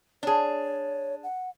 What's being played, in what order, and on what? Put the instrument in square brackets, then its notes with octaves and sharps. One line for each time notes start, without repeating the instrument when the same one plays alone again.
[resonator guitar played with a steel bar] D4 G#4 [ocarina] C#5
[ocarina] F#5